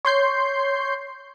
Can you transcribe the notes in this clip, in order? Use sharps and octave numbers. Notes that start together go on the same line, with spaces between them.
C#5 C6 G6 C7